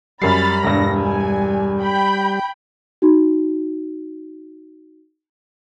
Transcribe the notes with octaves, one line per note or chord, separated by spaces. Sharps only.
F#2 G3 B5 F6 A6 C7
E1 G2 A#6
G#5
G5 B5 G6
D#4 F#4